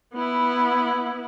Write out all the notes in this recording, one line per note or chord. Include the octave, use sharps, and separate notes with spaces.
B3 E4